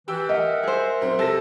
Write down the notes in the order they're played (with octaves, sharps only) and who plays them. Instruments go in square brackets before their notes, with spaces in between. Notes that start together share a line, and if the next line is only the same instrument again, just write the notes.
[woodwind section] E3 [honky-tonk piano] G4 G5 E6
[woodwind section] A#4 E5 F#5 [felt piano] D#5
[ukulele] G#4 C5
[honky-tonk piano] F#2 C4
[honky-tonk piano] C3 A#6 [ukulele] A4